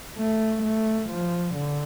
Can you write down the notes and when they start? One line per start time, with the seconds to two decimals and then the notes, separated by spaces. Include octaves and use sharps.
0.18 A3
0.64 A3
1.10 F3
1.56 D3